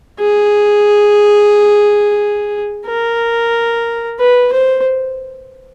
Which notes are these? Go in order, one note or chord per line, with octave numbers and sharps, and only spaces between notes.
G#4
A#4
B4
C5